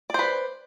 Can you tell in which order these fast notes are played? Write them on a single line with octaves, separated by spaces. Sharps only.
D5 C5 B4